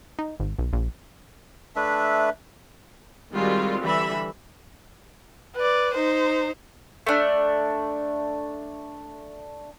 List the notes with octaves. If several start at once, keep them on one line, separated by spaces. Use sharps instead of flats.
D#4
G#1
B1
A#1
A3 D4 B4 E5
D#3 G3 G#3 C4 F4 F#4
D3 E3 G3 E5 B5
B4 D5
D#4 C5
A3 D4